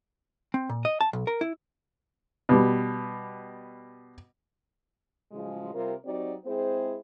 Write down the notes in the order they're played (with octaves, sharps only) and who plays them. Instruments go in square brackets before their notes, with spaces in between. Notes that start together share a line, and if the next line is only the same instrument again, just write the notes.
[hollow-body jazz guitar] C4
A#2
D#5
A5
B1
A#4
E4
[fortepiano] B2 G3
[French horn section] A2 C#3 F3 F#3 G#3
C3 G3 F4 A#4
F#3 C4 D#4 F#4 G4 D5
G#3 C4 E4 G#4 C5